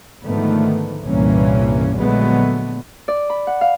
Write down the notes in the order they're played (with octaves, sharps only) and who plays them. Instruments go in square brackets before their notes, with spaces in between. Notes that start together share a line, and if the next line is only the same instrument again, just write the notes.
[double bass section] G#2 D3 D#3 F3 A3 B3
C2 G2 A#2 E3 A#3 C#4
A#1 D3 F#3 G#3 A3 B3
[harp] D5
B5
F#5
F5